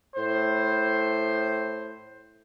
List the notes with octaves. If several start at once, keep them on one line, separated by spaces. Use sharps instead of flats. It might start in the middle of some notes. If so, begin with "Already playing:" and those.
A2 C5